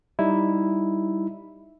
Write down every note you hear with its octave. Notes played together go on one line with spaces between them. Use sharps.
G3 D#4 E4